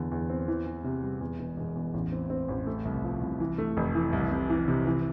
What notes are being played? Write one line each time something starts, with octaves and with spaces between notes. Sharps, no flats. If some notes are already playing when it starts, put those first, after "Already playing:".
Already playing: E2 D3
E2
C4
E3
E3
C3
G3
E2
E1
E1
E2
A1
C4
C4
A1
A3
C2
F3
C2
E3
A3
F1
E3
C2
C3
E3
C3
E3